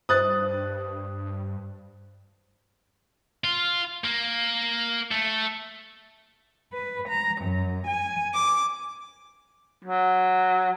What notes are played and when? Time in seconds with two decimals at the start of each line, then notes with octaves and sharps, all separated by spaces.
0.09 G2 C5 D#6 F#6 A6
3.44 F4
4.04 A#3
5.12 A3
6.73 B4
7.08 A#5
7.42 F#2
7.87 G#5
8.33 D6
9.85 F#3